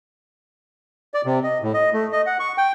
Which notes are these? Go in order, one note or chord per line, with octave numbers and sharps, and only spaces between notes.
D5
C3
D#5
A2
D#5
A3
D#5
F#5
C#6
G5